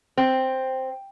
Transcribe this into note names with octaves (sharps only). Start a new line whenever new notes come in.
C4